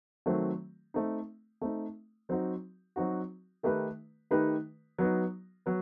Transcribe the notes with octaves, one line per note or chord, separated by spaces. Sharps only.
D#3 F#3 A3 C4
A3 C4 D#4
A3 C4 D#4
F#3 C4 D#4 F#4
F#3 C4 D#4 F#4
D#3 A3 D#4 G4 B4
D#3 A3 D#4 G4 B4
F#3 B3 D#4
F#3 B3